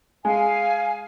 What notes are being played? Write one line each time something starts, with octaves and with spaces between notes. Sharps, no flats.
G#3 F5 G#5